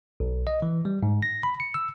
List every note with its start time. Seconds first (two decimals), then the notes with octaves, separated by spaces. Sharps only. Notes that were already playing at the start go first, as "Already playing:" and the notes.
0.20 B1
0.47 D#5
0.62 E3
0.85 G3
1.03 G#2
1.22 A#6
1.43 B5
1.60 C#7
1.74 E6